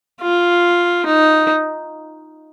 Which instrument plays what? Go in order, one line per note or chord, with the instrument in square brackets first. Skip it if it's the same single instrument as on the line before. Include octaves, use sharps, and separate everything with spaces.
[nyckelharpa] F4
D#4